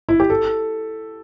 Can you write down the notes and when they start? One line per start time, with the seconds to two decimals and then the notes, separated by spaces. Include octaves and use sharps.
0.09 E4
0.20 G4
0.30 A4